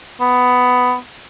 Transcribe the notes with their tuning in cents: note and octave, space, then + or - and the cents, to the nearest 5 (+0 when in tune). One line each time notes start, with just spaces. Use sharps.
B3 +10